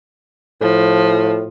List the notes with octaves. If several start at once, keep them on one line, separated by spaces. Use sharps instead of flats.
A2 F3